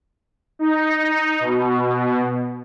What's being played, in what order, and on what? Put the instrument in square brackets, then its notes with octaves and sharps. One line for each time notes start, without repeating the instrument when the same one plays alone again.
[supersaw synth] D#4
B2